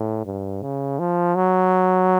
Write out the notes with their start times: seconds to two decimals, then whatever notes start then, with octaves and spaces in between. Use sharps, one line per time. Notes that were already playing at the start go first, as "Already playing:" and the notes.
Already playing: A2
0.25 G2
0.62 C#3
0.99 F3
1.36 F#3